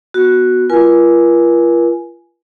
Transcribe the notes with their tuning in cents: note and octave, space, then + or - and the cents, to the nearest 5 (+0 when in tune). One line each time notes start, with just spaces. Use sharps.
B3 +0 F#4 +0
F4 -35 A#4 +45 G#5 +0